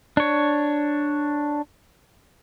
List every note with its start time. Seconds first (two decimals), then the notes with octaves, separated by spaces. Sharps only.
0.17 D4 C#5